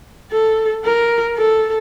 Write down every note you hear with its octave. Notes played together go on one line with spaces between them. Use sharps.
A4
A#4
A4